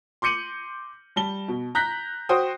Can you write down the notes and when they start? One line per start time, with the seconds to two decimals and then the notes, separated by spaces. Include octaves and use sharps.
0.22 C6 D6 G6 C#7 D#7 F#7
1.16 G3 A5 G7
1.48 B2
1.75 A#5 F#6 G6 A#6 B6
2.29 F#4 C5 G5 D#6